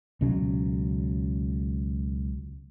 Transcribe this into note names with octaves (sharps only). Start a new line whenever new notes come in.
C#2 B2 F#3 C#4